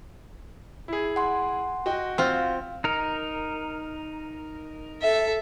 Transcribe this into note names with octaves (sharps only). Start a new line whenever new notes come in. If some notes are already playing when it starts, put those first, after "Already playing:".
E4 G#4
F#5 G#5 C6
F#4 D#5 G5
C4 F4 F5
D#4 A#4
A4 E5